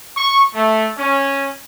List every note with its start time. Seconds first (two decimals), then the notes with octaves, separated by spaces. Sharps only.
0.17 C#6
0.53 A3
0.97 C#4